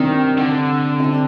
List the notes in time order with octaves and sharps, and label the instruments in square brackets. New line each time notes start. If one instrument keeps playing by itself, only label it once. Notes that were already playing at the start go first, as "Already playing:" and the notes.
Already playing: [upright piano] C3 C4 D4 [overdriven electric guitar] D#3
[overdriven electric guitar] D3
[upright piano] C3 C4